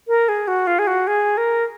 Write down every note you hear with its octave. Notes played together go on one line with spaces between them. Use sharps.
A#4
G#4
F#4
F4
G#4
F#4
G#4
A#4